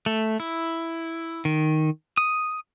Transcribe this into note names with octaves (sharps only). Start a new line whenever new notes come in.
A3
E4
D#3
D#6